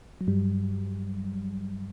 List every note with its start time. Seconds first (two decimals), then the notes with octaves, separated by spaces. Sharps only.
0.21 F#3
0.27 G2 G3